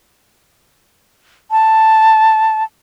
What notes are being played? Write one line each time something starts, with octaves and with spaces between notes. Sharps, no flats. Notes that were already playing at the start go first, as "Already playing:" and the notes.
A5